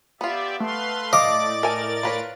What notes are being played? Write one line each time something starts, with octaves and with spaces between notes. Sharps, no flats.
B3 F4 G4 D5 E5
A3 B4 F5 C6
A2 D5 D#5 F5 D6 A6
A3 A#4 G#5
F4 B4 C#5